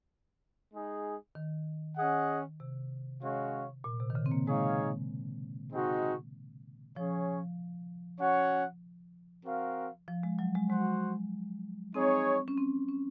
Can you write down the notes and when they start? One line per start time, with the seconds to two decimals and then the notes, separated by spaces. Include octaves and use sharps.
0.72 G#3 D#4 G#4
1.35 D#3
1.98 C#4 G#4 D#5 F#5
2.60 C3
3.22 G#3 C#4 F#4 C#5 F5
3.84 A#2
4.00 C3
4.10 D#3
4.15 C#3
4.26 C4
4.32 A#3
4.47 G#3 D#4 G#4 C#5 F5
5.72 G#3 C4 D#4 F#4
6.96 F3 C#4 G#4 C#5
8.20 C#4 F#4 C#5 F#5
9.45 C4 F#4 A#4 F5
10.08 F3
10.23 G#3
10.39 F#3
10.55 G#3
10.69 G#3 F#4 C5 F#5
11.94 C4 D#4 G#4 C#5
12.48 C#4
12.58 C4
12.89 C#4